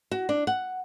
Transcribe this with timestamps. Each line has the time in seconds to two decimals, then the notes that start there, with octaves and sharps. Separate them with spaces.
0.11 F#4
0.29 D4
0.47 F#5